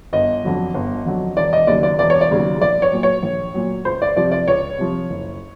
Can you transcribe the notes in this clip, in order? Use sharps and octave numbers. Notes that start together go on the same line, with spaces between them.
G1 D#5
F2 D3 F#3
G1
F2 D3 F#3
E1 D5
D#5
D#2 C#3 F#3 D5
D5
E1 D5
C#5
D5
D#2 C#3 F#3
A#1 D5
C#5
A#2 F#3
C#5
A#1
A#2 F#3
C#2 C5
D5
C3 F3 D5
D5
C#2 C#5
C3 F3
F#1